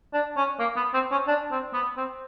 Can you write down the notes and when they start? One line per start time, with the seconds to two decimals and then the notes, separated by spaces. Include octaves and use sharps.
0.13 D4
0.37 C#4
0.59 A#3
0.76 B3
0.94 C4
1.11 C#4
1.27 D4
1.51 C4
1.74 B3
1.97 C4